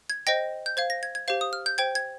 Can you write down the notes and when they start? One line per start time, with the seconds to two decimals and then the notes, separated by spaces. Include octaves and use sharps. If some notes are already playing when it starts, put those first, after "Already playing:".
0.10 G#6
0.27 C5 D#5 G5 A#6
0.66 G6
0.77 C5 F5 G#6
0.90 A#6
1.03 G#6
1.15 G#6
1.28 G4 C5 F5
1.41 D#6
1.53 F6
1.66 G6
1.78 C5 G5 G#6
1.95 G#6